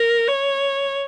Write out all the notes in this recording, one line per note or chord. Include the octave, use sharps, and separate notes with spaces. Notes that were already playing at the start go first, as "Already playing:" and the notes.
Already playing: A#4
C#5